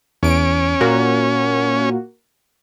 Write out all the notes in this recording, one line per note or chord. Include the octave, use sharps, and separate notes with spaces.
E2 C#4 D7
A#2 A#3 F#4